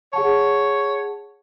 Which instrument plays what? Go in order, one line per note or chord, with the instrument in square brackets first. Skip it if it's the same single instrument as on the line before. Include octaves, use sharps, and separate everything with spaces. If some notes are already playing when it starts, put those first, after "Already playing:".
[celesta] G#4 F#5 A5 [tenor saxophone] C#5